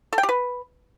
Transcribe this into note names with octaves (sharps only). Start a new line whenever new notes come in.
A4
G5
G4
B4